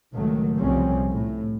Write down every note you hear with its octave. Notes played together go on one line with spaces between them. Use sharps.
C#2 A#2 D#3 F#3 A3
C2 C#3 F3 G3 C4 C#4
A2